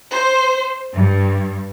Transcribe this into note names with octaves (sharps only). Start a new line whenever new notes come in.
C5
G2